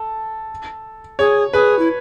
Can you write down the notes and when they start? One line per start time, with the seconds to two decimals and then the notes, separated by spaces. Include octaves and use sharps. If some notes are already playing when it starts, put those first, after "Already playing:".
Already playing: A4
1.19 G#4 C#5
1.53 G#4 B4
1.79 E4